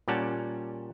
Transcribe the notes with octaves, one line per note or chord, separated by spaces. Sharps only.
A#2 G3 C#4 F#5 A5